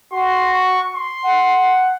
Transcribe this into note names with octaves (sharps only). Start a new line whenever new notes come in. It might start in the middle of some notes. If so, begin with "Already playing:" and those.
F#4 C6
C#6
C6
F#5